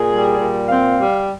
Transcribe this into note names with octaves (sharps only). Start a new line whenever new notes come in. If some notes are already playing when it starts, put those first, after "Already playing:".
Already playing: A#2 G#4
G3
A#2
C4 F5
G3